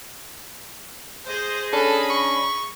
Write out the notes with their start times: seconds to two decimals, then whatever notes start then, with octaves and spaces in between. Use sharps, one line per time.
1.26 G#4 C5 D#5
1.73 C#4 D4 A4 B5
2.10 C#6